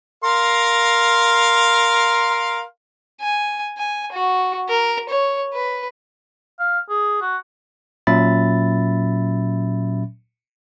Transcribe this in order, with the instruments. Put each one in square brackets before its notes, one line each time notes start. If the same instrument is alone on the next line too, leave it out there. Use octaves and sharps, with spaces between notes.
[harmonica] A#4 F5 C6
[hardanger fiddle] G#5
G#5
F#4
A#4
C#5
B4
[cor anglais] F5
G#4
F#4
[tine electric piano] A#2 F#3 C#4 E5 B5 A6